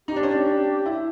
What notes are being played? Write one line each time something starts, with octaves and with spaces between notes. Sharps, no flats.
D#4 G4
D4
C#4
D4
E4